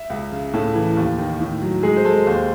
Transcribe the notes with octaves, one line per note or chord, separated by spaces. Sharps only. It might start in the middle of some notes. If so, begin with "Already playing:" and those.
Already playing: E5
C#2
C#3
A2 A4
E3
D#2
D#3
A2
F#3
G#3 G#4
C5
G#3 A4
D#2 C5